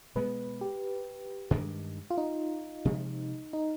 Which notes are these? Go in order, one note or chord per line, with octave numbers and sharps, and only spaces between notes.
B2 G#3 B3 B4
G4
G2 D#3 G#3 D4
F4
D#4
C3 F3 G#3
D#4